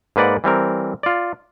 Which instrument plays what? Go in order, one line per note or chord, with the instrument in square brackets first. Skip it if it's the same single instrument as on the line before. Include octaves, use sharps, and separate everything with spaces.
[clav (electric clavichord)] G#2 A#3 B4 D5 F#5
E3 G3 C4 A#4
F4 D5